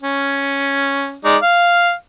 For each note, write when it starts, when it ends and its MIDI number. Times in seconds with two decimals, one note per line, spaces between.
0.03 1.17 61
1.25 1.37 56
1.25 1.37 63
1.25 1.37 74
1.42 1.92 77